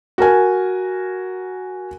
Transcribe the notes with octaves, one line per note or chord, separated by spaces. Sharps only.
F#4 A#4 G#5